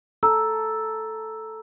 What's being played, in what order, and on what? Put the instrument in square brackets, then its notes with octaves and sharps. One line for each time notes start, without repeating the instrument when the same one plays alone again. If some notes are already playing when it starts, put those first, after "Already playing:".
[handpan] A4 [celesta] A#5 E6